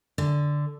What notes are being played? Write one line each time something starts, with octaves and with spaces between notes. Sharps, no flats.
D3